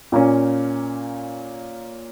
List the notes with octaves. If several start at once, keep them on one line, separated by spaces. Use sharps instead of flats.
A#2 A#3 C#4